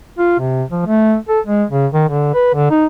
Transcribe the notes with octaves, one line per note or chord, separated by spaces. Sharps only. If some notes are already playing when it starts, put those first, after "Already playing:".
F4
C3
F3
A3
A4
G#3
C#3
D#3
D3
B4
D3
D#4